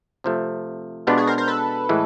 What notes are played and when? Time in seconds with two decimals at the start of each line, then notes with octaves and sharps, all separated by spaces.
0.24 C3 F3 A3
1.07 B2 G#3 B3 D4 F4 G4
1.17 F#4 G#4
1.27 A#4 C5
1.38 A#4 C5
1.48 A4 B4
1.89 A2 E3 G#3